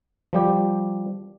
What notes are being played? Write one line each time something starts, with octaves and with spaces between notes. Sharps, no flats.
F3 G3 G4